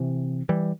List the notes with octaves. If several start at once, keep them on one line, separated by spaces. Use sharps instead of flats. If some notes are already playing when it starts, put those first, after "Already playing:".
Already playing: C3 E3
E3 G3